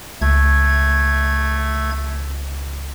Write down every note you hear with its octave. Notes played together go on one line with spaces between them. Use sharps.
C#2 A3 G#6